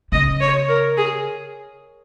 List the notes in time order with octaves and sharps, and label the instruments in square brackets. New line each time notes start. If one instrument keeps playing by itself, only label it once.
[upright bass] C#3 [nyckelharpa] D#5
[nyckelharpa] C#5
A#4
G#4